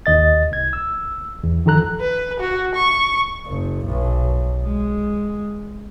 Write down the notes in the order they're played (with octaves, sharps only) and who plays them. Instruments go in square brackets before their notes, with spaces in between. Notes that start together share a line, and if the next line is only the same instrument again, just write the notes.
[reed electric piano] D#2 D#5 A6
C2 G#6
E6
E2
F#2 D#3 F3 A4 A#5 F#6
[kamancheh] B4
F#4
C#6
[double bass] F#1
B1
G#3